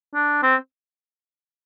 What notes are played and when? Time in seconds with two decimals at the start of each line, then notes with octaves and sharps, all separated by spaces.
0.14 D4
0.43 C4